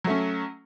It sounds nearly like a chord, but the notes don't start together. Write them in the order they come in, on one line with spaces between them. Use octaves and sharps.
F#3 A3 C#4